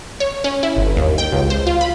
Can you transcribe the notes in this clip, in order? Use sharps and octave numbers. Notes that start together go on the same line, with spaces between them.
C#5
C#4
E4
G1
D#2
G5
C#2
C5
F4
B5